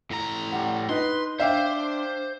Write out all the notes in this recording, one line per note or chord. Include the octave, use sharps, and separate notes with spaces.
A2 A#5
G3 F#5
D#4 B4 C6
D4 C5 E5 F5 G5